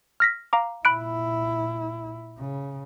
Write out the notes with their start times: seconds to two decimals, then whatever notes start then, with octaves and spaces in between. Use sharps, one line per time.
0.20 F6 A#6 B6
0.53 F5 A#5 D6
0.85 A#2 E4 B5 F#6 D7
2.39 C#3